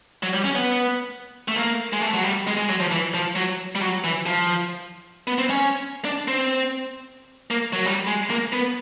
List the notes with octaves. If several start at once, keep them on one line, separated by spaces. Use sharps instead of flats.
F#3
G3
C#4
B3
A3
A#3
G#3
A3
F#3
G3
G#3
G#3
F#3
F3
E3
F3
F#3
G3
F#3
E3
F3
B3
C4
C#4
D4
C4
A#3
F#3
G3
G#3
A#3
B3